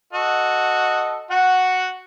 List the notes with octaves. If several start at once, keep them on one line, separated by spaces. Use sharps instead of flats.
F#4 A4 D#5
F#4 F#5